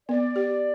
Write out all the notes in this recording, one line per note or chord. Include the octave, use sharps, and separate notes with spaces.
B3 D5
G4